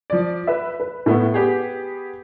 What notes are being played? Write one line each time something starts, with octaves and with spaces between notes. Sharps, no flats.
F3 D5
B4 E5
B4
A2 A3 B3
B3 G4 G#4